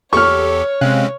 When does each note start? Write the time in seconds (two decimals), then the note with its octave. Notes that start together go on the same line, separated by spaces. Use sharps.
0.13 E2 G4 A4 C#5 C#6 F6
0.81 C3 G#3 C4 C#4 F5 F#6